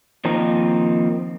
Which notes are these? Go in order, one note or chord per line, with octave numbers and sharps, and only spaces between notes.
D#3 F3 A#3 C4 D#4